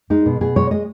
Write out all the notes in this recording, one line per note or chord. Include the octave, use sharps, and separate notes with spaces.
G#3 D#4
B2
B2 G#4
G#3 C#5
G#3 D#5